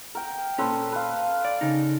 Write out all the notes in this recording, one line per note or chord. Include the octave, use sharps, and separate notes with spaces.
A#4 G5
A#2 C#4 A4 B4 C5
B4 F5
D5
C#3 D#4